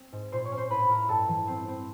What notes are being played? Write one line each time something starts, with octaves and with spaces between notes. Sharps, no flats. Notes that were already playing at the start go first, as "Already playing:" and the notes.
Already playing: C4
G#2
A#2 C5 C6
C#5 C#6
C#4
C5 C6
A2 B4 B5
A2 A#4 A#5
G2 A4 A5
E3
C4
C4